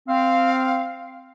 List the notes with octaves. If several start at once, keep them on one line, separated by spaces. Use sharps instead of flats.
C4 F5